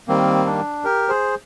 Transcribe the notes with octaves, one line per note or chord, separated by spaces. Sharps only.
D#3 G3 A#3 C4
D4
G4 A#4
G#4 C5